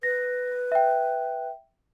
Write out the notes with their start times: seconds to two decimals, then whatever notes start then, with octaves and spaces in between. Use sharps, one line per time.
0.03 B4 A#6
0.72 E5 G5